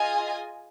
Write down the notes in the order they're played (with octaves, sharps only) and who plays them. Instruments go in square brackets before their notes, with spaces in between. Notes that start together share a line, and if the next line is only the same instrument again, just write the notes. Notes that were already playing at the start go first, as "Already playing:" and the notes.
Already playing: [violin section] F4 G#4 D#5 G#5